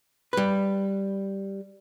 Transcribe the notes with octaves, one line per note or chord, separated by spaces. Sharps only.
G3 B4